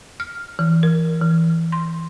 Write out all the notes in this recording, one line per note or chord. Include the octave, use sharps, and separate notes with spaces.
F6
E3
A#4
E3
C6